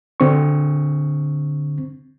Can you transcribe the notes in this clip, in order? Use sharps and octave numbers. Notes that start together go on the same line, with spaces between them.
D3 C4 C#6